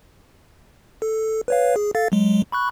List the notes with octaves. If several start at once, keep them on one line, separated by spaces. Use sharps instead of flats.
A4
B4 C#5 F5
G#4
A4 F5 A6
F#3 G#3
B5 C#6 F#6